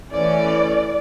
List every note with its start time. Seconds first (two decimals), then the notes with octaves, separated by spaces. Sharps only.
0.11 E3 A3 C#4 D5